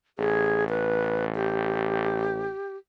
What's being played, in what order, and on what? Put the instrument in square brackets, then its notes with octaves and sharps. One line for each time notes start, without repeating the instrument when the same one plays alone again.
[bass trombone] A1 [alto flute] G#4
[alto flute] B4
G4